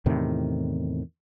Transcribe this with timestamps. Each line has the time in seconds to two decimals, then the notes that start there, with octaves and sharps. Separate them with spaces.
0.06 E2 A2 C3 D#3